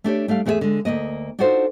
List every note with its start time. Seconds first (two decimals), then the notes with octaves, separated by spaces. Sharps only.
0.04 A3 D4 G4 C#5
0.28 G3 A3 D4 F5
0.45 E2 A3 C#4 F4 G#4 E5
0.61 D3 G#3
0.85 D2 A#2 A#3 D#5
1.39 D4 D#4 F4 F#4 A4 C5